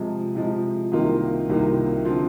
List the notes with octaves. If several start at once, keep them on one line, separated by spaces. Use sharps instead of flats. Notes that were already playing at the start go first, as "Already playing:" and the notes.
Already playing: C3 F3 G#3
C3 F3 G#3
C2 C3 D#3 A#3 F4
C2 C3 D#3 A#3 F4
D3 F3 C4 F4